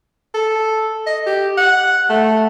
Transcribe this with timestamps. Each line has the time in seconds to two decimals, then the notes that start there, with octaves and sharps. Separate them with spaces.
0.34 A4
1.07 D#5
1.27 G4
1.57 F#5
2.10 A3